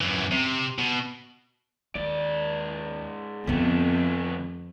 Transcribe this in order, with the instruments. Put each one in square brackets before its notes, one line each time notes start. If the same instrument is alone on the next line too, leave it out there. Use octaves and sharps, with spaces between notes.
[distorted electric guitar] F#2 E3
C3
B2
[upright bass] D#2 [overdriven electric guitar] G#2 D5
[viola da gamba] F2 [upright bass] D3 B3 [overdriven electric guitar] A3 C4